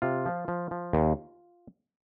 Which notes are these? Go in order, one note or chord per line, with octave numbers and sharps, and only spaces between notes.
C3 F4
F3
F3
F3
D#2